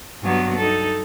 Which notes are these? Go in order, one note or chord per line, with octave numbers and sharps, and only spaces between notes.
G2 F#3 B3
D#4 A4